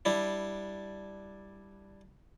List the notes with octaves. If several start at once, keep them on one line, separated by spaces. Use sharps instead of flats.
G3 D4 E4